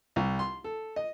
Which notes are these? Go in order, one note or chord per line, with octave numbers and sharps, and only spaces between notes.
C2
C6
A4
D#5